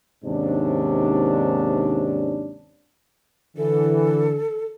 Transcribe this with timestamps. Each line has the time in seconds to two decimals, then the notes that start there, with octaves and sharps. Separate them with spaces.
0.25 D#2 G#2 C3 C#4 D4
3.57 D3 E3 A4